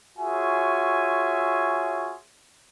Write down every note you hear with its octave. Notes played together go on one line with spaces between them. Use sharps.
F4 F#4 G#4 C#5 E5 G#5